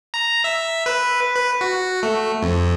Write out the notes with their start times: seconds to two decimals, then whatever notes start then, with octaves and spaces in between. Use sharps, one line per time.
0.14 A#5
0.44 E5
0.86 B4
1.36 B4
1.61 F#4
2.03 A3
2.43 F2